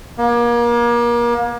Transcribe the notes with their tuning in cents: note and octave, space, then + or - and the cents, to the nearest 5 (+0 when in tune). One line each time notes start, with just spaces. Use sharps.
A#3 +35